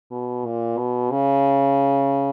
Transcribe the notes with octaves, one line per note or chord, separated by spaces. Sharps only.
B2
A#2
B2
C#3